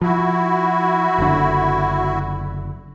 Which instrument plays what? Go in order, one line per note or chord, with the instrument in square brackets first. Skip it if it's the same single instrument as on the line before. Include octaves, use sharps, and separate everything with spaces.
[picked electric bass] F3 [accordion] E4 F#4
[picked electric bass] F#1 D3